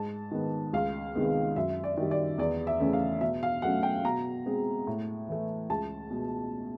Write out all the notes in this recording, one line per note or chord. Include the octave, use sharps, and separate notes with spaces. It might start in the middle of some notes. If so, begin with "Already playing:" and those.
Already playing: G#2 A5
D#3 G#3 B3
C#2 F5
C3 D#3 G#3 B3
F#2 E5
D5
D#3 G3
D5
E2 D5
E5
C#3 E3 A3 C#4
F5
B2 E5
F5
F#3 A3 C#4 F#5
G5
B2 A#5
G#3 C4
A2
E3 A3
C#2 A5
B2 G#3